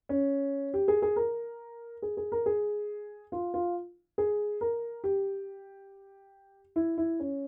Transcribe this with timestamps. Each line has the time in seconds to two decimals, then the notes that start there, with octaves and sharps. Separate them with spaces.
0.09 C#4
0.74 G4
0.88 G#4
1.02 G#4
1.16 A#4
2.02 G#4
2.17 G#4
2.32 A#4
2.46 G#4
3.32 F4
3.54 F4
4.18 G#4
4.61 A#4
5.04 G4
6.76 E4
6.98 E4
7.20 C#4